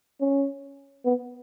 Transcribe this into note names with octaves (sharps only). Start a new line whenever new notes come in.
C#4
B3